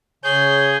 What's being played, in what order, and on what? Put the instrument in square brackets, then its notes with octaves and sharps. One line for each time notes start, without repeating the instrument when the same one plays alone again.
[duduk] C#3 [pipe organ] G#4 G#5 [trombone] C#5 [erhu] G6